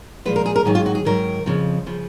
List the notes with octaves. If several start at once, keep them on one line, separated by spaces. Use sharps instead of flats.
A#2 F3 G#3 B4
A#4
G#4
A#4
G#2 D#3 F#3 G#4
F4
F#4
G#4
G#2 D#3 F#3 A#4
F2 C#3 F3
C#3 F3